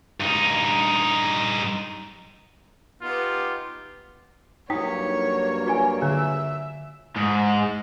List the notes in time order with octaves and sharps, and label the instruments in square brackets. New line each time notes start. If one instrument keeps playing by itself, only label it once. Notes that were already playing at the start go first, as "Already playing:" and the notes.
[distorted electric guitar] G2 D#4
[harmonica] B3 D#4 G4 [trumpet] F4
[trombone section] G2 F#3 A#3 [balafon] D#4 [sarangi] C#5 [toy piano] G5 D#6
[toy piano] F4 D5 G#5
[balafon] D3 [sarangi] E5
[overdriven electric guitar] G#2 G#3